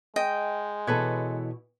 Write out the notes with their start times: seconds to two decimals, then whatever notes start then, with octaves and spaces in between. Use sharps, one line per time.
0.16 G#3 D#5 G5
0.87 B2 E3 A4 B4 C#5